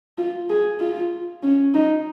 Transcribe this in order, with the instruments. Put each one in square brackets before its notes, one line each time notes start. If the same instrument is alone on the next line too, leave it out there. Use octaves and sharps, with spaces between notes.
[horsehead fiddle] F4
G#4
F4
C#4
D#4